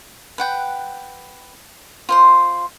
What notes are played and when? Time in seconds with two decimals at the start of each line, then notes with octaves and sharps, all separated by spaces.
0.38 B4 F#5 G5
2.09 F4 C5 C6